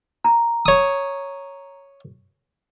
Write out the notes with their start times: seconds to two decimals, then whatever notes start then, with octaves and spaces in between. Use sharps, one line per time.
0.24 A#5
0.66 C#5 D#6